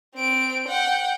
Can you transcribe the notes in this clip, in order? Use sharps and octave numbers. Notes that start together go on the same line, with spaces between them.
C4 D7
F#5 G5